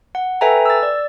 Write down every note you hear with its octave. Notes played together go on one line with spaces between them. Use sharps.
F#5
A4 B4 E5 G5 G#5 A#5
E6 A6
D5